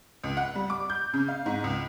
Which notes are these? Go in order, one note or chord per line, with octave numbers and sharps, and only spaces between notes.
C#2
F#5
G3
D6
G6
C#3
F5
G#2
C#2